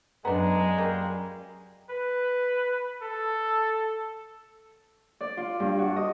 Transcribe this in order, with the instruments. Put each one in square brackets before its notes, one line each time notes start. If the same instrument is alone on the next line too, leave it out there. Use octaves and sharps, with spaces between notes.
[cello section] F#2 [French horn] G#3 [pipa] B3 D4 [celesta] A#5
[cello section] F#2 [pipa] G3 A#3
[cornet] B4
A4
[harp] D5
F4
G2
F#4
D#5